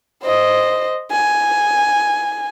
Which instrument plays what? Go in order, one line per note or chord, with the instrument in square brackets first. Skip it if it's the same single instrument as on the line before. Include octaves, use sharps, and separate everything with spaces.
[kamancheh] C5 D#5
G#5